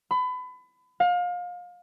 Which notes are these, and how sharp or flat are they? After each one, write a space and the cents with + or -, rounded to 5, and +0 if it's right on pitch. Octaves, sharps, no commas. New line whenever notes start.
B5 +30
F5 +30